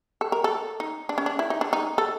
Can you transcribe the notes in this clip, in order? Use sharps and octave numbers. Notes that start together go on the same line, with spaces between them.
A4
A#4
A4
D#4
D4
C#4
D4
E4
D#4
D4
D#4
A4